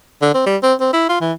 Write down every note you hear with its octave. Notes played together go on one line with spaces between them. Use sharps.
D3
C4
G3
C4
C4
E4
F4
E3